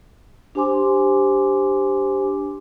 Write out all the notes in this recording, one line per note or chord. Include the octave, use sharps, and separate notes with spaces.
D4 G4 C5 G#5 C6 D6